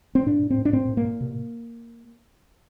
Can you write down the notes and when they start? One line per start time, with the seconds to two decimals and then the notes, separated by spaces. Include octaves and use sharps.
0.15 C4
0.26 A2 D4
0.43 A2
0.50 C4
0.58 A2
0.65 D4
0.73 A2 C4
0.89 A2
0.97 A#3
1.05 A2
1.21 C3